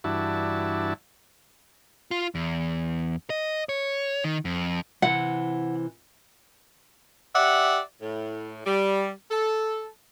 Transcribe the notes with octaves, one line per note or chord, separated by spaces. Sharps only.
G2 E3 D4 E4 F#4 A5
F4
E2
D#5
C#5
D#3
F2
C3 E3 F#5
G4 D5 E5 F#5
A2
G3
A4